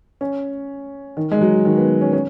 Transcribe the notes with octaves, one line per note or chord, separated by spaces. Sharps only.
C#4
D#3
G#3
F#3
D#3
B3
C#4
C#4